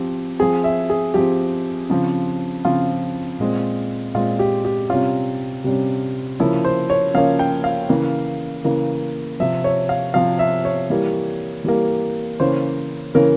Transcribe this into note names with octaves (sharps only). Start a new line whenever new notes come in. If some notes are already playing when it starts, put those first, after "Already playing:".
Already playing: F3 C4 G4
F3 C4 G#4
E5
G#4
F3 C4 G4
C#3 F3 C4
C#3 F3 C4 F4
A#2 G#3 C4
A#2 G#3 C4 F4
G4
G4
C3 G3 C#4 F4
C3 G3 C#4
C#3 F3 A#3 C#4 E4
C5
C#5
C#3 F3 A#3 C#4 F5
G5
F5
C#3 E3 A#3
C#3 E3 A#3
C3 F3 C4 E5
C#5
F5
C3 F3 C4 F5
E5
C#5
E3 G3 A#3
E3 G3 A#3
C#3 E3 A#3 C#4 C5
C#3 E3 A#3 C#4 A#4